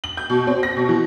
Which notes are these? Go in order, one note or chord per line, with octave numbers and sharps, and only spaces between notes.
F#7
G6
B2
C4
A#6
B2
E3